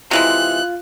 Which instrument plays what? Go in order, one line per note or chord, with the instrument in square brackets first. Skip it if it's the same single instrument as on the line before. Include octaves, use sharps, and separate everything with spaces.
[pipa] C3 E3 G#3 [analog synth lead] F4 [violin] F#6